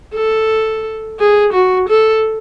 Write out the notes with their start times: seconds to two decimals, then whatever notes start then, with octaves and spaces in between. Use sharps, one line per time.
0.14 A4
1.19 G#4
1.53 F#4
1.89 A4